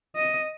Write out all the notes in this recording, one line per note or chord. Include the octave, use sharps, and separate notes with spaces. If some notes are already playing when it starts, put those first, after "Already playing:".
D#5